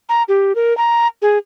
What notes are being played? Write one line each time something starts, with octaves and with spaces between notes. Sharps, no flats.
A#5
G4
A#4
A#5
G#4